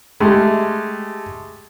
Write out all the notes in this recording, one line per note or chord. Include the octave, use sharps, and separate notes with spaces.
G#3 A3 G4